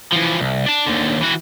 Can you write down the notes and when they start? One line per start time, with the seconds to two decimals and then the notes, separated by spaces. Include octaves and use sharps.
0.12 E3 F3
0.40 C2
0.66 D4 A5
0.87 D#2 D3
1.21 E3 F#4